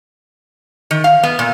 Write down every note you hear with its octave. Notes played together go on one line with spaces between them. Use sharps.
D#3
F5
B3
A#2